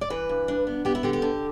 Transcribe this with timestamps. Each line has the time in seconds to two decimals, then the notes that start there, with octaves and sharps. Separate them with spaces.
0.01 D5
0.10 E3 B4
0.29 G2
0.48 D4
0.67 B3
0.85 B3 G4
0.95 E4
1.03 D3 G4
1.13 G4
1.22 D3